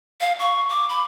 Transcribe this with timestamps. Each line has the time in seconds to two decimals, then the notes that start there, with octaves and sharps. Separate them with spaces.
0.20 F5
0.39 C#6
0.70 D6
0.89 B5